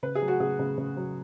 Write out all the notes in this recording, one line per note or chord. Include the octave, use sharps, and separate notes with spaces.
C#3 B4
G#4
F#3
F#4
C#3 G#4
C#3
C#3
F#3